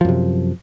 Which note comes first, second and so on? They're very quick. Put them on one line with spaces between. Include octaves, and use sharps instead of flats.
F3 F#2 C3